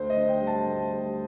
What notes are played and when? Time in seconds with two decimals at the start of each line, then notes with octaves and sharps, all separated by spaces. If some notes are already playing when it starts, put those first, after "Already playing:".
Already playing: D2 C5
0.10 D#5
0.16 D3
0.29 G5
0.41 G3
0.47 A5
0.67 D2
0.91 G3